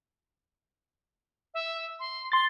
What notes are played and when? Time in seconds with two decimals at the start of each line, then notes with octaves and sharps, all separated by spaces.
1.54 E5
2.00 C6
2.32 C6 A6 G7